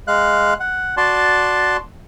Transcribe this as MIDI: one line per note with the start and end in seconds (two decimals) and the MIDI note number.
0.08 0.54 56
0.08 0.54 77
0.08 0.54 90
0.60 0.95 78
0.97 1.77 66
0.97 1.77 74
0.97 1.77 81
0.97 1.77 84